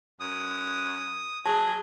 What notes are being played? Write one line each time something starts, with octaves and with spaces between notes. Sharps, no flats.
F#2 D#6
F#3 G#4 A5